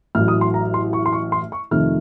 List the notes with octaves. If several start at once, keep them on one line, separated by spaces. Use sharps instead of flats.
A1 A2 F#3 F6
D#6
C6
A#5
C6
C#6
C6
C#6
C6
C#6
F2 C3 D#3 A3 F6